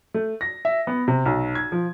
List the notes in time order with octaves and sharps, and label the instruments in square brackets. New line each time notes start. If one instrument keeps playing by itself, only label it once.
[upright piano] A3
A#6
E5
B3
C3
B1
G#6
F3